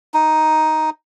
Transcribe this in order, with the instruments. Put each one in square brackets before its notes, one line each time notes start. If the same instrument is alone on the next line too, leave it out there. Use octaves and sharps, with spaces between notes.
[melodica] D#4